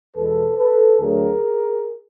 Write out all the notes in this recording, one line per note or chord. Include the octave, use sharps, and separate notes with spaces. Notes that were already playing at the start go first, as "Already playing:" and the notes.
E2 B2 G#3 A4 B4
A4 B4
D2 D3 F#3 A3 G#4 A#4